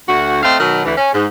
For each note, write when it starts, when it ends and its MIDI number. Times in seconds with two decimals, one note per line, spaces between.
0.08 0.40 38
0.08 0.40 66
0.43 0.56 57
0.43 0.56 60
0.43 0.56 75
0.43 0.56 77
0.59 0.84 47
0.59 0.84 51
0.59 0.84 54
0.85 0.93 38
0.85 0.93 52
0.97 1.10 61
1.12 1.26 44